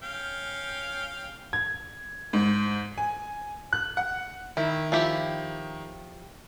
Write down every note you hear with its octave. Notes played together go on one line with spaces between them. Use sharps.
C#4 F5 G5
G#6
G#2
G#5
F#6
F#5
D#3 E4
F3 E4 G4